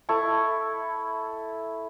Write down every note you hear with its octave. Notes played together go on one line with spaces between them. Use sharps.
E4 A4 C#6